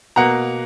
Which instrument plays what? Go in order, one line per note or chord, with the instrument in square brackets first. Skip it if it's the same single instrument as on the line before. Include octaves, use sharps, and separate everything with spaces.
[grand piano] B2 A#3 F#5 A#5